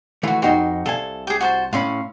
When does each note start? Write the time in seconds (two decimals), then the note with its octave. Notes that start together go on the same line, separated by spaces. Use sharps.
0.23 E3 A3 F4 F#4
0.42 F2 D#4 F#4 G4 C6
0.86 C2 A4 F5 G#5
1.27 G4 G#4
1.41 F#4 C5 A5
1.73 A2 C#4 F5 B5 C6